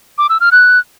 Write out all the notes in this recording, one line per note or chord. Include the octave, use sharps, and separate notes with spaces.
D6
E6
F6
F#6